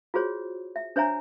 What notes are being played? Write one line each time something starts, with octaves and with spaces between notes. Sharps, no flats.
F4 F#4 G#4 C5 C#5
E5
D4 C5 C#5 E5 G#5 A#5